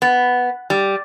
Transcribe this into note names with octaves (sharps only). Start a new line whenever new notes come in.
B3
G3